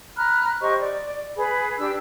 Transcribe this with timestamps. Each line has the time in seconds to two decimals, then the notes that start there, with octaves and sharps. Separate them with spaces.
0.17 A#5 B5 F6 F#6
0.61 G4 C5 D#5 C#6
0.79 D5
1.37 G#4 B4 B5
1.78 D4 G4 E6